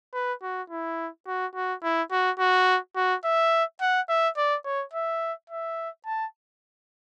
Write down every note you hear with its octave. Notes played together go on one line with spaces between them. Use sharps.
B4
F#4
E4
F#4
F#4
E4
F#4
F#4
F#4
E5
F#5
E5
D5
C#5
E5
E5
A5